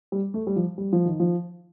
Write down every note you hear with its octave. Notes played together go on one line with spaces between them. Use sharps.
G3
A3
G3
F3
G3
F3
D#3
F3